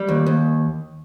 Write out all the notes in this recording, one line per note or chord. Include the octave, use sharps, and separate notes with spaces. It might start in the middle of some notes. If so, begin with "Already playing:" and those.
Already playing: G3
D#2
D#2